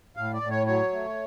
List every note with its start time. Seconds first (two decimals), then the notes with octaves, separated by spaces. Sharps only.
0.17 A2 F5
0.34 D5
0.42 A2
0.51 C#5
0.66 F#3 C#5
0.92 A3